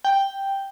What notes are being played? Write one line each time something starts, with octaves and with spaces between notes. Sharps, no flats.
G5